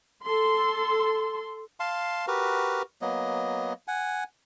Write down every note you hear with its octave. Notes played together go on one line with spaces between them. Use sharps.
A4 C6
F5 A5 C6
F#4 G4 A#4 B4
F#3 A#3 B3 D#5
F#5 G#5